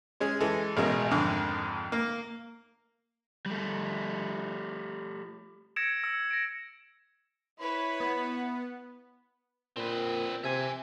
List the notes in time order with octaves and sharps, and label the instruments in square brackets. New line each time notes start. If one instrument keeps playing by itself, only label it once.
[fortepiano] G#3 C#4 G#4
E3 G#3 A4
A1 B2 G#3 A#4
F2 G#2 D3 D#3
A#3
[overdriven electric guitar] G3 A3
[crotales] E6 G#6 A#6 C#7 D7 E7
E6 C#7
A#6 D7
[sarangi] E4 [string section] B4 C#5 [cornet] B5
[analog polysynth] B3
[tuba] A#2 [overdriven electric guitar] C4 B4
[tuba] C3 [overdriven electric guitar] E5 G#5